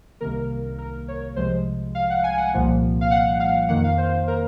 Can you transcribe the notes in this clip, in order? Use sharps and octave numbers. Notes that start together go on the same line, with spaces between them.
C2 C3 D#3 A#3 A#4
A#4
C#5
C2 C3 F3 G#3 C5
F5
F#5
G#5
F#5
C2 A#2 F3 A#3
F5
F#5
F5
F2 D#3 A#3 F#5
F5
C5
A#4